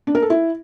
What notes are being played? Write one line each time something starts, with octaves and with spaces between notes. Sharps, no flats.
D4
A#4
A4
E4